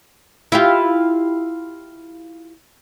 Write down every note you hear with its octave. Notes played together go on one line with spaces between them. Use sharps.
E4 F4 G4